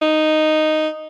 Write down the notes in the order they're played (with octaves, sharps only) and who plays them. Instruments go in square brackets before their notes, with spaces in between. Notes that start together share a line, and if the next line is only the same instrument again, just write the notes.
[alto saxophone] D#4